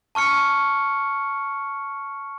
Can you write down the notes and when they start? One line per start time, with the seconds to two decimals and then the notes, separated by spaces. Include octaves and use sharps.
0.15 A5 C#6 F6 C#7